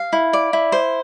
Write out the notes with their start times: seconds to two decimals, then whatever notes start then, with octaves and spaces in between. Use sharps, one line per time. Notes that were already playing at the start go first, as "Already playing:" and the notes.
Already playing: F5
0.13 E4
0.33 D5
0.53 E4
0.72 C5